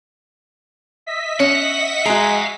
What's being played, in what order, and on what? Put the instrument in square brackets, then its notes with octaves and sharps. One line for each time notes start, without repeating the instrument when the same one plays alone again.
[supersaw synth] D#5 E5 B6
[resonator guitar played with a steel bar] C#4 [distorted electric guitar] F#5
[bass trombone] G#3 [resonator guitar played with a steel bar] F#4 A#5 [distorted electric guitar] F5 G5